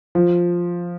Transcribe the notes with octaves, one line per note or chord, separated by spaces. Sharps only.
F3